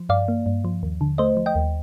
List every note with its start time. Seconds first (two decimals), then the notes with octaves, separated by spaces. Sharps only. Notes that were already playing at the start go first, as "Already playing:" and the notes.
Already playing: F3
0.09 G2 D5 F5
0.28 A#3
0.46 G2
0.65 F3
0.83 D#2
1.01 D3
1.18 A3 C5 D#5
1.37 F3
1.46 D#5 G5
1.55 D#2